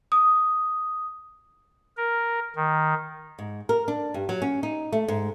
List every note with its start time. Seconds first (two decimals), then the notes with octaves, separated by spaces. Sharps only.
0.12 D#6
1.97 A#4
2.56 D#3
3.39 G#2
3.69 A#4
3.88 D4
4.14 G2
4.29 F#3
4.42 C#4
4.63 D#4
4.92 A3
5.08 G#2